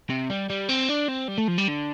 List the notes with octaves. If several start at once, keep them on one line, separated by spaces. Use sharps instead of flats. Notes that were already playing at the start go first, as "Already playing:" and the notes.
C3
G3
G3
C4
D4
C4
G3
A3
F3
G3
D3